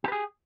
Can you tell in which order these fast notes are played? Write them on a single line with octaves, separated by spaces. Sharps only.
G4 B4 G#4